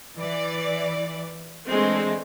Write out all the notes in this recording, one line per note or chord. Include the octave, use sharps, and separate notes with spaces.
E3 D5
E3 G#3 A3 C4 D4